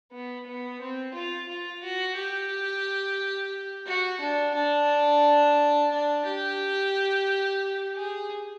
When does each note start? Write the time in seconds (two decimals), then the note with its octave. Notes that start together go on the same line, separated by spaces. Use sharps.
0.12 B3
0.47 B3
0.81 C4
1.14 F4
1.49 F4
1.83 F#4
2.16 G4
3.87 F#4
4.21 D4
4.54 D4
5.91 D4
6.25 G4
7.95 G#4